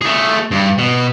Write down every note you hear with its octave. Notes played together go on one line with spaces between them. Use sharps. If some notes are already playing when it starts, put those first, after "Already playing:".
A3 G#4
G2
B2